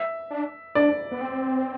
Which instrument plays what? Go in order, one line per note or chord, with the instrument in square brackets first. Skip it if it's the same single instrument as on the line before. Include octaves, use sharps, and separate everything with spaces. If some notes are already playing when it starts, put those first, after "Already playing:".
Already playing: [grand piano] E5
[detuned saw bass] D4
[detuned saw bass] D4 [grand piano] D5
[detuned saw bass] B3
C4